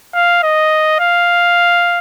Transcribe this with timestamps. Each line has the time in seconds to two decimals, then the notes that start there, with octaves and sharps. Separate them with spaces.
0.14 F5
0.43 D#5
1.00 F5